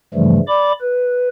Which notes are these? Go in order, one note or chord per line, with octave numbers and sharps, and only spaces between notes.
G2 C#3 E3 F3 G3 A3
D5 B5 D6
B4